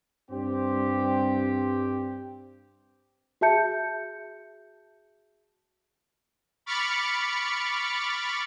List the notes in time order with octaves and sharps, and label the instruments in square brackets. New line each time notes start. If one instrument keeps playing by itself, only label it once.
[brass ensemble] G2 C4 G4
[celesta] F#4 G#4 E5 A5 G6 C#7
[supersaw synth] B5 C#6 D6 F6 A6 C#7